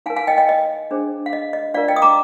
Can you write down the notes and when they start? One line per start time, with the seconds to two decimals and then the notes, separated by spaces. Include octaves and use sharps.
0.06 D#4 F5 G#5
0.10 A#4
0.16 F5 G#5
0.27 D#5 G5
0.38 D#5 G5
0.49 D#5
0.91 D4 G#4 C5
1.26 F5
1.33 D#5
1.53 D#5
1.74 D4 F4 A#4 D5 F5
1.88 D#5 G5
1.96 D#6
2.02 A#5 D6